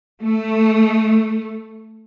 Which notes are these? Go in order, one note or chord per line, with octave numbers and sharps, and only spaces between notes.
A3